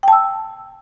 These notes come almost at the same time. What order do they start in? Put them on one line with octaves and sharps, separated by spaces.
G5 A5 E6